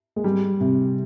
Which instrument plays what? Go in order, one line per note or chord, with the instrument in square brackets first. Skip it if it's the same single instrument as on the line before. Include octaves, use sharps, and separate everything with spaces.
[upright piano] G#3
G3
C3